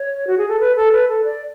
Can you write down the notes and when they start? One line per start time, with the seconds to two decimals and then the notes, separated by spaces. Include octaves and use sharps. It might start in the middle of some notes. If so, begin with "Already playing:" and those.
Already playing: C#5
0.27 F#4
0.38 G#4
0.49 A4
0.60 B4
0.76 A4
0.92 B4
1.08 A4
1.24 D5